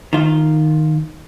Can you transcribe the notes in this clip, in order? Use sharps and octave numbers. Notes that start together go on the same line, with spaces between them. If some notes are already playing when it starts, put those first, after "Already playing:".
D#3 F4